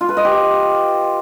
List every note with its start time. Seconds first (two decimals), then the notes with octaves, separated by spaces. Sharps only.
0.01 F4
0.09 B4
0.17 D#5
0.25 G4